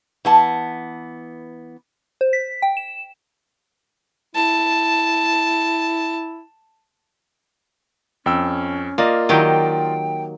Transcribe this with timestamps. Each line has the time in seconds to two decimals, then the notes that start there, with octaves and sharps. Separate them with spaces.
0.25 E3 B3 A5
2.21 C5
2.33 B6
2.62 G5
2.77 E7
4.36 E4 A5
8.26 F2 C#4 G5 E6
8.98 A#3 F4 D5 D#5
9.29 D#3 F#3 E4 G4
9.47 G5